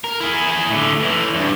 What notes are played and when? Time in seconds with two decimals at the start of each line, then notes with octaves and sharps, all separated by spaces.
0.04 A#4
0.20 E4 G#4
0.70 A2 D3
1.00 A2 E3
1.34 E2 G2